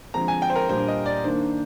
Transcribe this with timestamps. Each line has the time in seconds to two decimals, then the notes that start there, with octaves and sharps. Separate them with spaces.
0.14 D3 F3 G#3 C4 A#5
0.28 G#5
0.42 G5
0.50 C5
0.56 A#4
0.69 A#2 G3 D4 C5
0.88 D#5
1.06 D5
1.24 G2 D#3 A#3 D4 C5